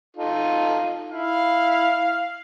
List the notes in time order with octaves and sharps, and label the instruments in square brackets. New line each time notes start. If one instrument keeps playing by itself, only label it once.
[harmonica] D#4 F4 A4
[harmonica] E4 [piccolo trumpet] F5